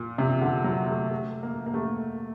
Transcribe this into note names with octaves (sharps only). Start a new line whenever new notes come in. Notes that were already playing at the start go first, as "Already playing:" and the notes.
Already playing: A#2
C3
D3
F#3
A3
A3
A#3
A#3
A3